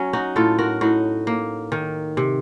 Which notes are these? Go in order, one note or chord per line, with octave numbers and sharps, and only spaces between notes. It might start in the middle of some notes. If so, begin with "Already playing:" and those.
Already playing: F#3 C#4
D#4 F#4
A2 F4 A4
F#4 A#4
A2 D#4 F#4
A#3
D#3
C3